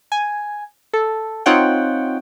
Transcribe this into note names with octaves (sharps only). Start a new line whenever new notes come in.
G#5
A4
C4 D#4 F4 C#5 F#5 G5